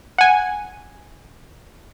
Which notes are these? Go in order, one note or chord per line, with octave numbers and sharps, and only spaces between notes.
F#5 G#5